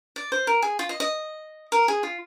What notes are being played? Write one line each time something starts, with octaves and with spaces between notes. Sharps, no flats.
D5
C5
A#4
G#4
F4
D#5
D#5
A#4
G#4
F4